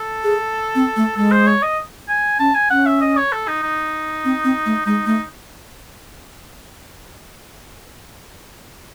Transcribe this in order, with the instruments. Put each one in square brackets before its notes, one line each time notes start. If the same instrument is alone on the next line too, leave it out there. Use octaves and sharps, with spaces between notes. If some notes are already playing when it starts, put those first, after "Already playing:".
Already playing: [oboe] A4
[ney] G#4
C4
A3
[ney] G#3 [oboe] A4
[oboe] C5
C#5
D#5
G#5
[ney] C#4 [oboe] A5
[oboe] G#5
[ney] C#4 [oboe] F#5
[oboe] E5
D#5
C#5
A4
D#4
D#4
[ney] C4
C4
A3
[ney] G#3 [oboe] D#4
[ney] A3 [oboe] D#4